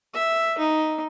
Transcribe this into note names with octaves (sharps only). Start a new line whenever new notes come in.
E5
D#4